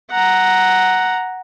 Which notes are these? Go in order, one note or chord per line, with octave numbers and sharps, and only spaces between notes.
F#5 A#5